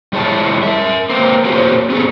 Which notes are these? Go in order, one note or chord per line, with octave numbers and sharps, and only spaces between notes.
G3 G#3 E4 C#5 A5
A#4 E5
A#3 C4
A#3 C4 F#4 G#4 C5 C#5
B3 C#4 G#4 A4